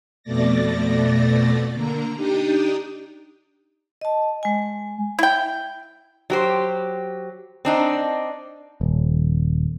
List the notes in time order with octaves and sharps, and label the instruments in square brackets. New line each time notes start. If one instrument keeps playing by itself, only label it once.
[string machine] F2 B2 A3 D5 A6 A#6
D3 A#3 A#5
D4 D#4 G4 D#5 G5
[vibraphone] D#5 A5
G#3 G#5
[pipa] E4 G5
[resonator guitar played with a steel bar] F#3 G4 C5
C4 D4 D#4
[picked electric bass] D#1